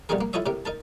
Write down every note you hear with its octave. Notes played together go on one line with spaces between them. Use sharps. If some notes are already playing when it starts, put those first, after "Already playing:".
B2 G3 A3 D#4 G#4 A#4
A#3
E4 F4 A4 C#5 D#5 E5
A2 C3 A#4 D6
D#4 A#4 A5